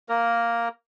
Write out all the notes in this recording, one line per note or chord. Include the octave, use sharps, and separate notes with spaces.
A#3 A#4